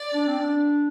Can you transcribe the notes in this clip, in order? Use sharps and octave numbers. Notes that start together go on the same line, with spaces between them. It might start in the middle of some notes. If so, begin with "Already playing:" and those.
Already playing: D5
D4
C4
D4